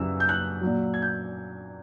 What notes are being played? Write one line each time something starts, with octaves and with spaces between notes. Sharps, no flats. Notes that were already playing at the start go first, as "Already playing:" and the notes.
Already playing: F#2 C#3 E3 G3 E6
G6
F#6
A#2 F#3
G#6
G6